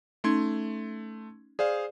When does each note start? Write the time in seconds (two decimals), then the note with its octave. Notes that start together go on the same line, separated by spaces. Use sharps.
0.24 A3 C#4 D#4 C6 G#6
1.59 G#4 C5 D5 F5